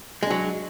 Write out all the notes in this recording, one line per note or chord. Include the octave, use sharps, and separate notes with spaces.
F#3 G#3 D4